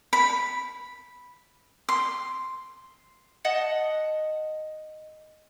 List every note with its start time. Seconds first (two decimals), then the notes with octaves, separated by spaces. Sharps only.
0.13 B5
1.89 C6
3.44 D#5 F#5 A5